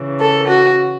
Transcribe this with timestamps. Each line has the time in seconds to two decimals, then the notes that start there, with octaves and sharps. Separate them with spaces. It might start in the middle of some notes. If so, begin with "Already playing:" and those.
Already playing: C#3 E3
0.19 A4
0.48 F#4